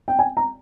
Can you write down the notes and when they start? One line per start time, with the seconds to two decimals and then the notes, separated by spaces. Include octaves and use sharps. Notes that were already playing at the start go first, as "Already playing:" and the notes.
0.08 G5
0.19 G#5
0.37 A#5